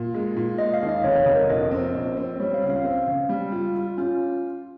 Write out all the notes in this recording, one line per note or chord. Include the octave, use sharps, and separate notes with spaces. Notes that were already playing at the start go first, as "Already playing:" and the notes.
Already playing: A#2
G#3
A#2
G#3 D#5
F5
D#2
D#5
F1 C#5
F1
A#4
A#1 D#5
C4
A#1
C4
G3 C#5
F5
C#2
F5
C4
C#3
G3
F4
F4
C#4 F4